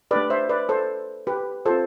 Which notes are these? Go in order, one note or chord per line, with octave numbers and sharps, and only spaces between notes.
A3 D4 G4 B4 D5
C5 E5
B4 D5
A4 C5
G4 B4
C4 F4 A4 C5